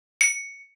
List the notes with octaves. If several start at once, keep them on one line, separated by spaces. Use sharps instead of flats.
C#7